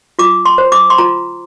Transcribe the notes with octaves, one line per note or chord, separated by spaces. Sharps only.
F4 D6
C6
C5
D6
C6
F4 A#5